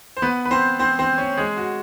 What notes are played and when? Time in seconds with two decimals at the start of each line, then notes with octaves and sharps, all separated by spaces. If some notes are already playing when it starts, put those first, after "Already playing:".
0.17 C5
0.22 B3 B4
0.45 B4
0.51 C4 C5
0.79 C4 C5
0.99 C4 C5
1.18 C#4 C#5
1.37 G#3 G#4
1.57 F#4